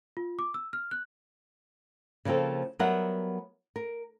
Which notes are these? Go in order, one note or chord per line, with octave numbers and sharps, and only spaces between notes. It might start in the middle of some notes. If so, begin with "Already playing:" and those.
F4
D6
E6
F6
F#6
C#3 F3 A#3 C4 A4
F#3 G3 B3 A#4 E5 F#5
A#4